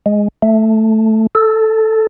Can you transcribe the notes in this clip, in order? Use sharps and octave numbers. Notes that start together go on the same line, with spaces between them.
G#3
A3
A4